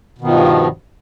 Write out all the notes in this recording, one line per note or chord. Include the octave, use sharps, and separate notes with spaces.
G2 B2 D#3 F3